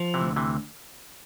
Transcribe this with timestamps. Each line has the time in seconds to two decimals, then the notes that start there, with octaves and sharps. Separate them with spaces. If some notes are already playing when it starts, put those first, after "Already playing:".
Already playing: F3
0.14 C3 E3
0.21 D2
0.36 C3 E3